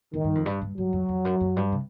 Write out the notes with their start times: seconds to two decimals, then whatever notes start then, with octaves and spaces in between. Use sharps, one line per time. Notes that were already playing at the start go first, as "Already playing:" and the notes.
0.13 G2 D#3
0.24 G2
0.35 F2
0.46 G2
0.61 G2
0.77 G2 F#3
0.93 F2
1.09 F2
1.25 F#2
1.40 F#2
1.56 G2
1.72 C3